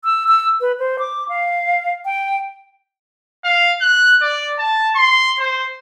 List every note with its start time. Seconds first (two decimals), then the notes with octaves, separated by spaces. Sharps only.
0.05 E6
0.28 E6
0.61 B4
0.79 C5
0.99 D6
1.29 F5
2.05 G5
3.44 F5
3.81 F#6
4.22 D5
4.59 A5
4.96 C6
5.39 C5